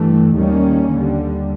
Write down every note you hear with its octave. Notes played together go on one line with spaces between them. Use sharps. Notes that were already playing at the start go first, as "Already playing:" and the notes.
Already playing: G2 E3 A3
D#2 D#3 G3 A#3 C#4
D#2 D3 G3